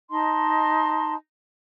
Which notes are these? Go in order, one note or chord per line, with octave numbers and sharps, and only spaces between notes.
D#4 D#5 A5 C6